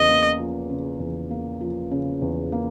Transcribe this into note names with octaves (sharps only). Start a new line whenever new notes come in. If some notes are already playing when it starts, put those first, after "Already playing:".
Already playing: E2 C#3 D#5
A#3
F3
C#3
E2
A#3
F3
C#3
E2
A#3